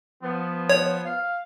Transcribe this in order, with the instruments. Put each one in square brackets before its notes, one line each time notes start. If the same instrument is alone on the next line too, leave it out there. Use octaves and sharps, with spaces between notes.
[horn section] F3 B3
[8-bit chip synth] C#5
[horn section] F5